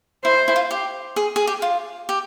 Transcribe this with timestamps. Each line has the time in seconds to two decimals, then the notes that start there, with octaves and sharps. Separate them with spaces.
0.24 E4 C5
0.48 E4
0.56 F4
0.71 G4
1.16 G#4
1.36 G#4
1.47 G4
1.62 F4
2.09 G4